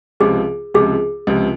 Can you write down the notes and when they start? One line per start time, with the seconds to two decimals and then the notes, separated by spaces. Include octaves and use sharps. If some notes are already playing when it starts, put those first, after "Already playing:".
0.20 C#2 C3 F3 G#4
0.74 C#2 C3 F3 G#4
1.27 C#2 C3 F3